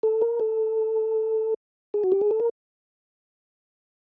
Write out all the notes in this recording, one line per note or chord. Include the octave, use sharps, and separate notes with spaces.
A4
A#4
A4
G#4
F#4
G4
G#4
A4
A#4